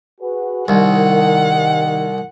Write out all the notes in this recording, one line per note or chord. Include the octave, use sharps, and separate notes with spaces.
F#4 G#4 B4
C2 D#3 F#5